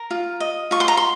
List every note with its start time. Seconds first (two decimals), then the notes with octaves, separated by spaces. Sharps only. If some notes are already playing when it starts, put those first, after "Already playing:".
Already playing: A#4
0.11 F4
0.40 D#5
0.71 F4 C#6
0.80 C6
0.88 A#5
0.97 C6